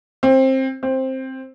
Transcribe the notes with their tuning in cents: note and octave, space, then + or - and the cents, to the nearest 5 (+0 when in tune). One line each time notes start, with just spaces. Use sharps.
C4 +20
C4 +10